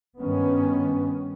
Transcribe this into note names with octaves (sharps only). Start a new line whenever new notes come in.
G2 D#3 B3 C#4